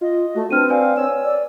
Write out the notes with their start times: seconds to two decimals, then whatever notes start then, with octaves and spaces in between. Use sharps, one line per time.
0.01 F4 D#5
0.35 A3 F#4
0.50 C4 D4 B4 F6 D#7
0.70 B4 D5 F5 G#5
0.97 C#5 E6
1.25 D5